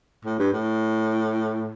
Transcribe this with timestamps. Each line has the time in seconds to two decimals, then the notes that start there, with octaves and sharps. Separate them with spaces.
0.25 A2
0.39 G2
0.53 A2